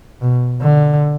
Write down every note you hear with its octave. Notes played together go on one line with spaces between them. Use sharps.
B2
D3